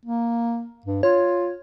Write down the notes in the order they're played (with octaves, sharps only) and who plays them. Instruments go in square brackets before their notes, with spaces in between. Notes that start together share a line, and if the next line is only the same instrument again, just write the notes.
[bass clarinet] A#3
G2
[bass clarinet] F4 [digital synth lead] C#5